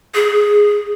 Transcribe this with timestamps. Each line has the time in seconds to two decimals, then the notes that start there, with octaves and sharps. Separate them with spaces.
0.15 G#4